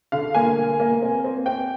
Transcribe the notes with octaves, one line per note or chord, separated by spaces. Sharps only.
D3 F5
A#3 G#5
A#3
A#3
C4
C4
C4 G5